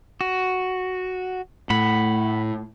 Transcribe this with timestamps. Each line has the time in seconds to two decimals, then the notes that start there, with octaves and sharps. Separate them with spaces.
0.21 F#4
1.70 A2 F#5 B5